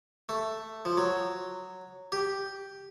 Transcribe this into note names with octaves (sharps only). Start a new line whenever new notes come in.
A3
F3
F#3
G4